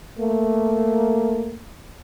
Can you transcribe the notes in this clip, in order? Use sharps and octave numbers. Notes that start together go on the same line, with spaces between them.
A3 A#3